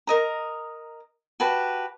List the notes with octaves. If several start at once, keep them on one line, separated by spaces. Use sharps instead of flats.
A#4 D#5 A#5
F#4 G4 B4 A5